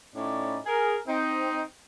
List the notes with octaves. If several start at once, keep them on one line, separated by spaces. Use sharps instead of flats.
A2 C#4 D#4 E4 D5
G#4 A#4
C4 D#4